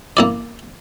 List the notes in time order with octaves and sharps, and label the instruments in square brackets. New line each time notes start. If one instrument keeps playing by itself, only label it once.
[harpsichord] A#3 E4 D5